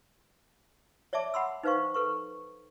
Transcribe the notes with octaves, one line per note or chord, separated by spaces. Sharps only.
C#5 D5 E5 A5 D6
F#5 B5 C6 E6
D#4 B4 C5 F5 C#6
A4 B4 C#6